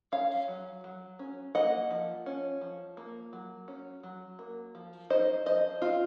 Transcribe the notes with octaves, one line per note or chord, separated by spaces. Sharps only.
C#4 C#5 F5
F#3
F#3
C#4
A#3 D#5 F#5
F3
C#4
F3
A#3
F#3
C#4
F#3
A#3
F3
D#4 C5 D#5
F3 C5 D#5
C4 F4